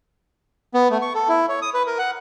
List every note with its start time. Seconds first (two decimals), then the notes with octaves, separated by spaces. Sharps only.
0.74 B3
0.90 A3
1.02 C#6
1.15 A4
1.29 E4
1.49 C#5
1.62 D#6
1.74 B4
1.87 A#4
1.98 F#5